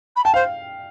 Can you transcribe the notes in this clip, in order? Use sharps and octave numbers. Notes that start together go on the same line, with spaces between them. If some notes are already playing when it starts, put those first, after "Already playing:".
B5
G5 A5
C5 F5